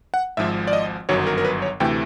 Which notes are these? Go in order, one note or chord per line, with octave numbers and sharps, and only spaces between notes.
F#5
G#1 G#2 F3 E5
D5
D#5
G1 F#2 D#3 F#3 C#5
A#4
A#4
B4
C#5
D2 C3 E3 A3 G5